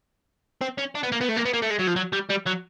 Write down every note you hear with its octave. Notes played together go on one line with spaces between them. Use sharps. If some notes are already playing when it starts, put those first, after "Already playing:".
C4
C#4
D4
B3
A#3
B3
A3
A#3
B3
A#3
A3
G#3
F#3
F3
F#3
G3
G3
F#3